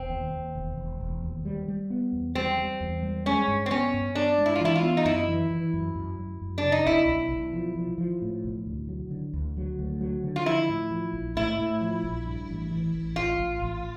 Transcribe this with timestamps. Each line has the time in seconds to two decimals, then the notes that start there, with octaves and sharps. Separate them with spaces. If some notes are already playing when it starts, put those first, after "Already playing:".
Already playing: E1 C4
0.10 D#2
0.33 D#2
0.55 E1
0.77 E1
1.01 E1
1.23 D#2
1.45 G3
1.68 G3
1.90 B3
2.12 E2
2.35 G3 C4
2.59 G3
2.81 E2
3.03 G3
3.26 G#3 C#4
3.48 G2
3.66 C4
3.71 B3 C#4
3.94 G2
4.15 B3 D4
4.38 G#3
4.46 E4
4.56 F4
4.60 E3 E4
4.75 F4
4.83 B3
4.97 D#4
5.05 F#2 E4
5.28 E3
5.51 E3
5.74 F#2
5.96 F#2
6.19 F#2
6.42 F#2
6.58 D4
6.63 C#3
6.72 D#4
6.86 B1 E4
7.08 B1
7.32 B1
7.53 F3
7.76 F3
7.98 F3
8.22 A2
8.44 B1
8.66 D2
8.89 F#3
9.11 D3
9.34 D2
9.57 F#3
9.79 D2
10.01 F#3
10.24 D3
10.36 F4
10.46 F3 E4
10.69 A2
10.91 F3
11.13 A#1
11.36 A2 E4
11.58 A2
11.81 F3
12.04 A#1
12.26 G2
12.49 A1
12.71 E3
12.94 A1
13.16 A1 F4
13.39 A1
13.62 A1